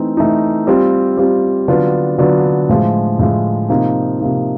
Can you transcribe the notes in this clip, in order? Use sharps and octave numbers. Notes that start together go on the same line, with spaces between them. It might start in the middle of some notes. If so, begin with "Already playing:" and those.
Already playing: E3 A3 C4 D#4
E3 A3 C4 D#4
G3 C4 F4
G3 C4 F4
D3 F#3 B3 D4 F4
D3 F#3 B3 D4 F4
A2 F3 G#3
A2 F3 G#3
C3 F3 A#3 D#4
C3 F3 A#3 D#4